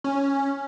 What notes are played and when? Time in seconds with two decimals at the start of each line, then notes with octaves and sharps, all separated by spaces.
0.04 C#4